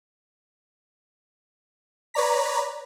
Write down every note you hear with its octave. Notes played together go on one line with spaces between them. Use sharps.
B4 C#5 D5 A#5 B6